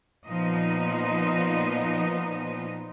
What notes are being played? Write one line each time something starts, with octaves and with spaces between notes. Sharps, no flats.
A#2 F3 B3 D#4 D#5